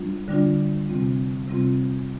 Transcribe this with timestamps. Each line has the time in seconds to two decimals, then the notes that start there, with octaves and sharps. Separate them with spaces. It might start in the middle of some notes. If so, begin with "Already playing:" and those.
Already playing: G3 D4 F4
0.28 D3 G3 D4 F4
0.88 C3 G3 C4 F4
1.48 C3 G3 C4 F4